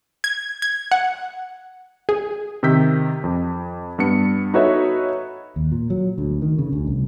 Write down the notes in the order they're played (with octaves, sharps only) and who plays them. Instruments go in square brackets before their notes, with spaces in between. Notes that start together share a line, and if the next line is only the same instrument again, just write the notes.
[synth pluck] G#6
G#6
F#5
G#4
[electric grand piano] C3 D#3 E6 G6 B6
F2
G2 B3 C#7
D#4 F#4 A4 B4 C#5 E5
[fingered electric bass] D#2
A#2
F#3
D2
D#3
C#3
D2
C2